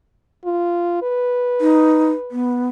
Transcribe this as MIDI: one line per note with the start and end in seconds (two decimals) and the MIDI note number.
0.45 0.99 65
1.02 2.45 71
1.61 2.11 63
2.31 2.68 59